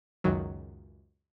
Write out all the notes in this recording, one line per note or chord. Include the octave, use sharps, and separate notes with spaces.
C#2 F#2 D#3 F#3